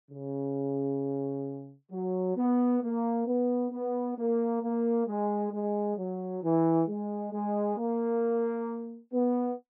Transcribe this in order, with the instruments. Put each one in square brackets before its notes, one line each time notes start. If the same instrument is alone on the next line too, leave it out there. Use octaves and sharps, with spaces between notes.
[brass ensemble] C#3
F#3
B3
A#3
B3
B3
A#3
A#3
G#3
G#3
F#3
E3
G#3
G#3
A#3
B3